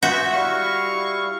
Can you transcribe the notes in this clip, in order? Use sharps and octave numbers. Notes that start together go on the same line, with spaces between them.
B3 F4 F#4 E5 G#5
G3 E4 F5 C#6